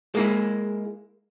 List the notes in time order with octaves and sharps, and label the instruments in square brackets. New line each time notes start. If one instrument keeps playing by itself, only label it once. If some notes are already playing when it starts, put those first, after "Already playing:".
[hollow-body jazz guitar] G#3 A#3 E4